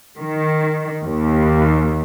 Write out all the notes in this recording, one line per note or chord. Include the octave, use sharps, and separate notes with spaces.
D#3
D#2